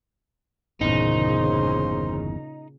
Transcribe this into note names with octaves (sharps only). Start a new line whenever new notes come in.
G1 E2 A#2 C#3 D#4 C5